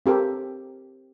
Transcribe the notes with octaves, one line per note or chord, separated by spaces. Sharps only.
C4 G4 A4 A#4